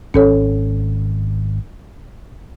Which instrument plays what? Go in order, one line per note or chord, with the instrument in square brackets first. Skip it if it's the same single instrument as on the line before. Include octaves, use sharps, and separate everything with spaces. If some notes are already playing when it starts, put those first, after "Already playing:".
[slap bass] G#1 [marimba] C#4 A4 C#5